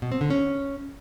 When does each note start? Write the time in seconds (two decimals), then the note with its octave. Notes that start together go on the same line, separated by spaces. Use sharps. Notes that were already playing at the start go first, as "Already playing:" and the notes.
0.02 B2
0.12 C4
0.21 D3
0.30 C#4